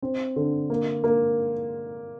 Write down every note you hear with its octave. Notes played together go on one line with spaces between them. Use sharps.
C4
D3
A#3
A#3